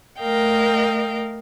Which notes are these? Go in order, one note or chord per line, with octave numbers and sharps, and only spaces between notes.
A3 A#4 D#5 F5 G5